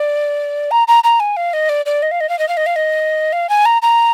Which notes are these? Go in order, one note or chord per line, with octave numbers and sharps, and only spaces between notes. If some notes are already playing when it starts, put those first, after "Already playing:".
Already playing: D5
A#5
A#5
A#5
G#5
F5
D#5
D5
D5
D#5
F5
D#5
F5
D#5
F5
D#5
F5
D#5
F5
G#5
A#5
A#5